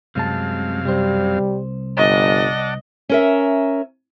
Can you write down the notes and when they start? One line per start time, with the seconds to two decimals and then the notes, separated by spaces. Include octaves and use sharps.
0.15 C2 F#2 C3 G#3 F5 A5
0.85 C2 G3 C5
1.98 G1 D5 D#5 F#5 A5
3.09 C#4 A#4 E5